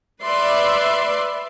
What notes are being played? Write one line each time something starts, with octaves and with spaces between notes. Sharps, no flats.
B4 D5 E5 C6